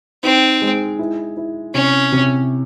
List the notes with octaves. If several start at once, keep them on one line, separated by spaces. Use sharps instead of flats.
C4 D#4
G#3
E4
E4
C3 C#4
C3